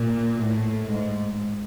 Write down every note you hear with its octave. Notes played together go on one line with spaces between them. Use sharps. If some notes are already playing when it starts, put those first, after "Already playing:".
Already playing: A#2
A2
G#2